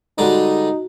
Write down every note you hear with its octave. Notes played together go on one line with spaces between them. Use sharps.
D3 G3 G#3 D#4 F#4 A#5